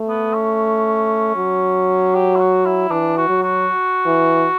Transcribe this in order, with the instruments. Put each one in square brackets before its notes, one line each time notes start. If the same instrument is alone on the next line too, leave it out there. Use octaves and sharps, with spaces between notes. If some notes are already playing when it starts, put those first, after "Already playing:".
Already playing: [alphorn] A3
[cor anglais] B3
C#4
[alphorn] F#3
[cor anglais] G4
E4
F#4
E4
[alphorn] E3 [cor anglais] D4
[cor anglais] F#4
[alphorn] F#3
[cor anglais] F#4
[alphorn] E3